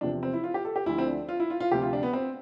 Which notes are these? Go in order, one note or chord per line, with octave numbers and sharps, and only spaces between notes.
E2 C3 F3 D4
C4
E4
F4
G4
A4
G4
D2 D3 F3 E4
C4
D4
F4
E4
F4
F4
D2 C3 F3 G4
F4
D4
B3
C4